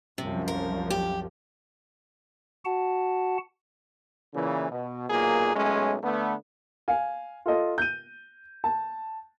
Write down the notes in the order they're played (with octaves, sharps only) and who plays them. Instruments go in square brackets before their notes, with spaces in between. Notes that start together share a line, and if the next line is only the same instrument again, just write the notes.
[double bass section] C2 F#2 F3 [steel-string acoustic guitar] C3
[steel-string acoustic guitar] A#4
G4
[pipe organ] F#4 F#5 A5
[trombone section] A#2 C#3 E3
B2
B1 A#2 A#3 G#4
B1 G#3 A3 C#4
D3 A3 B3
[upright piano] F5 G#5
F4 A4 D#5
G6 D#7
A5